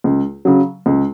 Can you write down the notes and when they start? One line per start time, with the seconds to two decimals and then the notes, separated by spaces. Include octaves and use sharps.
0.04 C#2
0.45 C#3 F#3
0.86 C#2